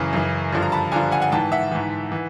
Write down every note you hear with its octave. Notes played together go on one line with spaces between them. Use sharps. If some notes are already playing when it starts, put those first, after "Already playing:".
Already playing: F#2 C#3 E3
F#2 C#3 E3
G2 D3 F3
A#5
A5 B5
G2 D3 F3 G#5 A#5
F#5 G#5
F#5 G#5
G#2 E3 G5 A5
E5 F#5
G#2 E3
E3